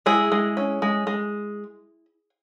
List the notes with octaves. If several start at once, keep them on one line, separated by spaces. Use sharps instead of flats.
G#3 E4 G#4
G#3
C#4
G#3
G#3